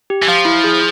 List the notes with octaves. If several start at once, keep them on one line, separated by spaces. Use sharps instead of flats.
G4
E3
F3 F5
E4
G#4